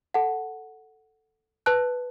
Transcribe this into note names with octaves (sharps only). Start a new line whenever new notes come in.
A4 F#5 A5
B4 A5 F#6